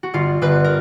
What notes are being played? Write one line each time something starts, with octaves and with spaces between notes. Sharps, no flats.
F#4
G1 F4
G1 B4
A#4